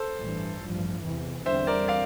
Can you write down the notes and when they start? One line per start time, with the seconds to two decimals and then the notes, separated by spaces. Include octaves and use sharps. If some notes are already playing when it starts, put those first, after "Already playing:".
Already playing: A4 C5
0.19 A1 G2 E3
0.62 A1 G2 F3
1.03 E2 C3 E3
1.46 E2 D3 G3 C4 C5 E5
1.67 A#4 D5
1.88 D5 F5